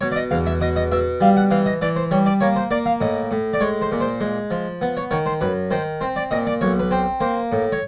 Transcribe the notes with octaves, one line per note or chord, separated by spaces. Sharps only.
B2 C#5
D5
D#5
E2 F5
E5
B2 D#5
D#5
B2 E5
G3 F5
F#5
E3 F5
D#5
E3 D5
C5
G3 C#5
D5
A#3 C#5
C5
A#3 D5
F5
A2 D#5
A2
D5
G#3 C#5
C5
A#2
C5
G#3
F3
B3
C#5
D#3 C#5
C5
F#2 B4
D#3 C5
C4 C5
D5
A#2 D#5
D5
B1 C#5
B4
C4 C5
A#3 C5
A2
C#5